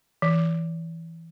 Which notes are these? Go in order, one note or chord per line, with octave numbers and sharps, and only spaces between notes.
E3